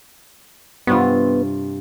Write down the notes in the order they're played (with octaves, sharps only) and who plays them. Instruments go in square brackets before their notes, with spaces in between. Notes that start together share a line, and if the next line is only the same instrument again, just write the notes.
[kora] G2 C3 F4 [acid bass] B3